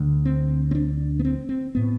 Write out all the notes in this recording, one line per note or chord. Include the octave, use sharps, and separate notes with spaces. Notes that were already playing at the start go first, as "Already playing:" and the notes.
Already playing: D2 D3
C4
C4
D4
B3
C4
C4
A2 B3